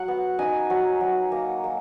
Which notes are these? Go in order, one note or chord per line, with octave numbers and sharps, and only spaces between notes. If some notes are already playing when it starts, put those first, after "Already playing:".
Already playing: F#3 F#5
B3
D#4 G#5
F#3
F#3
A#3
A#3